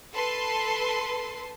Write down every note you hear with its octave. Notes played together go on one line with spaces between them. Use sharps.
A4 B4 A5 C6